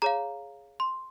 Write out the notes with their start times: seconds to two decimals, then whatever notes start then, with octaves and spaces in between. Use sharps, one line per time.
0.02 G#4 C#5 F5 A#5
0.80 C6